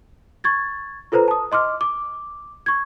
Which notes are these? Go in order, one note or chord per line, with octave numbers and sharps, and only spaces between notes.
C#6 G#6 A6
F4 A4 B4 C5 A#5
A5 D#6
D#5 C6 D6 F6
D6
C#6 G#6